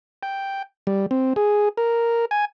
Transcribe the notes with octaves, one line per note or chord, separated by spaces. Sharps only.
G5
G3
C4
G#4
A#4
G#5